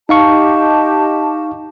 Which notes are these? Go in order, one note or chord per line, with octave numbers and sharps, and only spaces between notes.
D#4 G4 D#5 F5 A5 C#6